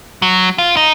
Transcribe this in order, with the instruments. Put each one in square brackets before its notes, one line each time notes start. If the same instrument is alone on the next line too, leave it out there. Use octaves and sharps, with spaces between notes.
[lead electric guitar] F#3
F4
D#4